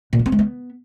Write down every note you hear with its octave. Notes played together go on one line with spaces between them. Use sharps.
A#2
B3
C4
G#3
B3